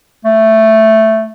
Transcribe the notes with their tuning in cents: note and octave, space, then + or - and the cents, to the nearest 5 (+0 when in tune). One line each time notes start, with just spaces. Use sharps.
A3 +5